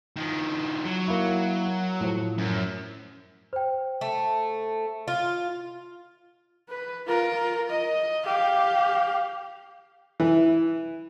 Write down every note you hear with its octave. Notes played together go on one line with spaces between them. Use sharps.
D#3 F3
F#3
A#3 E4
A2 F3
F#2
C5 G5
A3
F4
B4
F4 A#4
D#5
G4 F5
E3